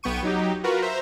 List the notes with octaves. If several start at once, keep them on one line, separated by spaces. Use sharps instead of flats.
B1 B3 G5 C#6 D#7
F#3 D#4 G4
F4 F#4 A#4 B4
C5 E5 A#5